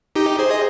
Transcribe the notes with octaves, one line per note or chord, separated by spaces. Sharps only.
D#4 G4
G#4 C5
D#5